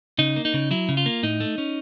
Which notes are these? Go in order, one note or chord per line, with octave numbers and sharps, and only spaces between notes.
C#3 D#4
A#3
D#4
C#3
F#3 E4
C#3
F4
A#3
A2 D#4
A3
C#4